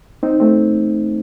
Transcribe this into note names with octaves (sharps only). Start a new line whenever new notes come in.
C4 D#4
A3 C4